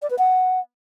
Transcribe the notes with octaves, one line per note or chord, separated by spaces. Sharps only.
D5
B4
F#5